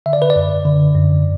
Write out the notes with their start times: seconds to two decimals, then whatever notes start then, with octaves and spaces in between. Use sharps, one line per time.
0.06 D3 E5
0.13 D5
0.22 B4
0.30 D5
0.36 F#2
0.65 D3
0.95 F#2